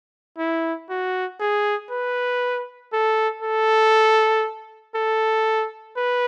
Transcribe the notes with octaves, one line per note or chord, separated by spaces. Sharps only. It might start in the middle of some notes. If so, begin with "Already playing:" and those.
E4
F#4
G#4
B4
A4
A4
A4
B4